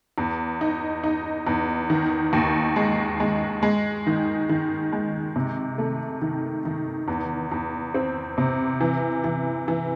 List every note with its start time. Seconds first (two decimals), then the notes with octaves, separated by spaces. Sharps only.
0.18 E2
0.61 D#4
1.03 D#4
1.47 E2
1.90 D#3
2.33 D#2
2.76 G#3
3.20 G#3
3.63 G#3
4.07 D#3
4.49 D#3
4.93 G#3
5.36 C3
5.78 A3
6.22 D#3
6.65 D#3
7.08 E2
7.52 E2
7.94 C4
8.38 C3
8.81 E3
9.24 E3
9.68 E3